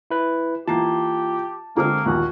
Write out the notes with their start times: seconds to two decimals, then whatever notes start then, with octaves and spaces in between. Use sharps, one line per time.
0.11 E4 B4
0.68 E3 A#3 F4 G4 A5 C7
1.77 D3 G#3 A#3 C4 A#5 D#6 F6
2.06 A#1 D#2 F#4